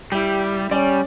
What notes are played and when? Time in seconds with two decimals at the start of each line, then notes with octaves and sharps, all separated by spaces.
0.12 G3 E4 G4
0.71 G3 C#4 D5